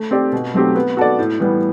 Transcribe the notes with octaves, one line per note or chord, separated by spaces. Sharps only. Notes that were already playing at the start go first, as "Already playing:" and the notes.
Already playing: A3
C4 G4 D5
B2
F#3 A3 C4 G4
B3
F#4 A4 D5
A2
E3 G3 B3